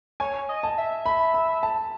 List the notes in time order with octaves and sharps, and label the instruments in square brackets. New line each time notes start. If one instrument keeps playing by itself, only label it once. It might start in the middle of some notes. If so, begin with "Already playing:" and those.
[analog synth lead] C#5 [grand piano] G#5
[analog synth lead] D#5
[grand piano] A5
[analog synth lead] E5
[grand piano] B5
B5
A5